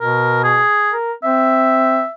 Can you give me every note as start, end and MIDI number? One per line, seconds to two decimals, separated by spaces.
0.01 0.62 47
0.01 0.40 70
0.44 0.93 68
0.93 1.12 70
1.24 2.03 60
1.24 2.12 76